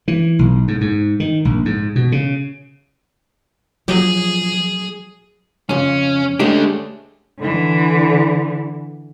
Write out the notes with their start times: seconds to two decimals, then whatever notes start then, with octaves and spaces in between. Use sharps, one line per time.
0.08 E3
0.39 B1
0.68 G#2
0.81 G#2
1.20 D#3
1.45 A#1
1.65 G#2
1.96 B2
2.12 C#3
3.88 F3 F#3 G#4
5.69 F2 C#3 C#4
6.39 G#3 A3 C#4 D4 G4
7.39 D3 E3